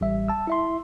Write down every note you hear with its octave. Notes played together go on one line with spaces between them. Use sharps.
A1 G3 E5
A5 E6
E4 E5 C6